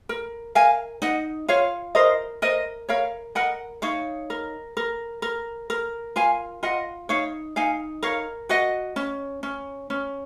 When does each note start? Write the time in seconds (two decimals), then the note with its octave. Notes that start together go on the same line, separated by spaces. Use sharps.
0.09 A#4
0.55 A#4 F5 G#5
1.02 D#4 D#5 F#5
1.48 F4 C#5 F5
1.95 A#4 C5 D#5
2.42 A#4 C5 D#5
2.89 A#4 C#5 F5
3.35 A#4 D#5 F#5
3.82 D#4 C#5 F5
4.30 A#4
4.77 A#4
5.22 A#4
5.70 A#4
6.16 F4 F5 G#5
6.63 F4 D#5 F#5
7.09 D#4 C#5 F5
7.56 D#4 F5 G#5
8.03 A#4 C#5 F5
8.49 F#4 D#5 F#5
8.96 C#4
9.43 C#4
9.90 C#4